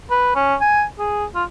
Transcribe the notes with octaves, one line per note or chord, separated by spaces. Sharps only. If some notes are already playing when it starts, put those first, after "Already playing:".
B4
C#4
G#5
G#4
F4